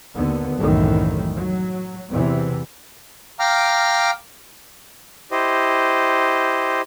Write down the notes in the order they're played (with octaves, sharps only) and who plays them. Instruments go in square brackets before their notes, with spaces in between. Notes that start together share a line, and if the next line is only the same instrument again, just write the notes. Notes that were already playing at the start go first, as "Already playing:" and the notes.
[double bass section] D#2 D3 B3
C2 F#2 A2 D#3 E3
F#3
E2 C3 E3
[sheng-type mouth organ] F5 G5 A#5 D6 F6
E4 G4 C5 D#5